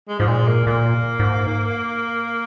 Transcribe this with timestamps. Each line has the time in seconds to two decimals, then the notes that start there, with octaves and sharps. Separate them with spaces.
0.09 G#3
0.20 G#2 F3
0.28 A#2 G#3
0.48 A#3
0.67 A#2 A#3
1.19 G#2